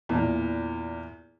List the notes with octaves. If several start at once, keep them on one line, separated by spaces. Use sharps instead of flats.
E2 A#2